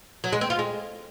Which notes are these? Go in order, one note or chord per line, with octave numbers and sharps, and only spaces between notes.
F#3
G#3
C4
F4
G#3